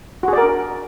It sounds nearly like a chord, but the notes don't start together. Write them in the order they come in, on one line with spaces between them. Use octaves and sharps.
F#4 G#4 D5 A#4 D4